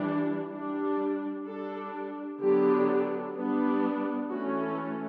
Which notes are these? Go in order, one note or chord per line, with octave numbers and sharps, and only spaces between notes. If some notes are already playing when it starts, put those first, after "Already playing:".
Already playing: E3 G3 D4
G3 D4
G3 D4 A4
D3 F#3 B3 D4 G4
G3 B3 D4
E3 A3 C#4 F#4
A4